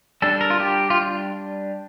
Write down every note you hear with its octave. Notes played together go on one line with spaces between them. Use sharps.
G3 D4 A4
A#4
F4
G4
F4